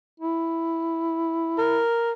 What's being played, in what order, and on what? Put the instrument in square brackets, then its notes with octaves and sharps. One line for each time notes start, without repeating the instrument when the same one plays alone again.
[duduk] E4
[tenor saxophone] A#4